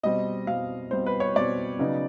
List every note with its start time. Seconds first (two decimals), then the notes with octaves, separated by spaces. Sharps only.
0.03 B2 G3 C4 D#5
0.47 B2 G3 C4 F5
0.91 B2 G3 C4 C5
1.06 B4
1.20 C#5
1.35 B2 G3 C4 D5
1.79 C#3 F#3 B3 D#4